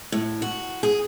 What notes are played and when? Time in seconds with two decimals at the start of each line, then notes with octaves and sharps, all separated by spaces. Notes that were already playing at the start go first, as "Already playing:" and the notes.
0.12 A2
0.42 F#4
0.83 G#4